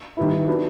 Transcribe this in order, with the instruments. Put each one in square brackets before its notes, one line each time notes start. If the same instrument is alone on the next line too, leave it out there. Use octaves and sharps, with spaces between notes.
[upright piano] D#3 G3 B3 E4
F#3 B3 D4